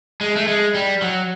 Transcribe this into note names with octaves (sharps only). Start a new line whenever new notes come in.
G#3
A3
G#3
G3
F#3